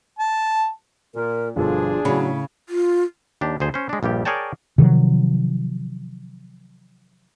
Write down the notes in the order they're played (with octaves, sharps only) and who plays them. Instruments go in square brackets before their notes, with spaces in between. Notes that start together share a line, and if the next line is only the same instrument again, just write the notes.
[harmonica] A5
[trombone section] A#2 [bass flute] A#4
[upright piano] G1 B2 A4 [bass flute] F3 [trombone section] D4 G#4
[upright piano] A2 B5 [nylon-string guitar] C#3 [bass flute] F#3
[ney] F4
[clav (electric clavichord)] D#2 D4 G4
D2 G#4 C5
C#4 C5
G#3 D4
A#1 G2 G3 G4
G#4 A#4 C#5 D5 G5 A5
[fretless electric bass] C3 D#3 F3 F#3